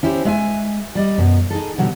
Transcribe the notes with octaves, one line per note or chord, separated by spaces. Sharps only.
C#4 E4 G4 C5
G#3 E5 G#5
G3 D5 D#5
F#2 B2
D#4 G#4 A4
B2 D3 F#3 G3